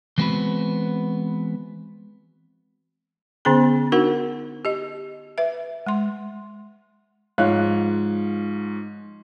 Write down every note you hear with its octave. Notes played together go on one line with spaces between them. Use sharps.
E3 G#3 B3 C4 F#4 B4
D3 B3 C#4 G#4 A#5
D4 D#4 F#4 A#4 F#5
G4 D#5
B4 E5
G#3 C6
G#2 F3 C#5 F5 F#6